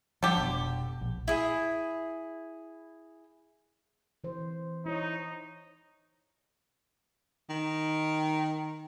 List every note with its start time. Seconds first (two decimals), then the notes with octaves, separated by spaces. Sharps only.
0.23 D3 F3 G3 G4
0.36 F1 B2
1.01 A#1
1.28 E4 G#4
4.24 E3 C5
4.86 D#4 E4 C#5
7.50 D#3